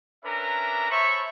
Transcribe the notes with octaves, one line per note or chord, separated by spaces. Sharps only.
C#4 D4 A#4 B4 E5 A#5
C5 C#5 E5 A5 B5 C#6